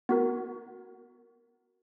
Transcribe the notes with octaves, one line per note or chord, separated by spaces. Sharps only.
B3 F#4 A#4